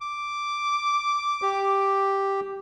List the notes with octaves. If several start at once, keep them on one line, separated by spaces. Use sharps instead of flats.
D6
G4